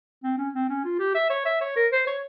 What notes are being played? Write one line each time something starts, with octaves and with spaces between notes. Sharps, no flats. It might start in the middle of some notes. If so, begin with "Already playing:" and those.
C4
C#4
C4
C#4
F4
G4
E5
C#5
E5
C#5
A#4
C5
C#5